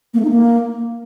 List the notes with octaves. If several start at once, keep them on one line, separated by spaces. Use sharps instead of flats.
A#3
A3
D#4
A#3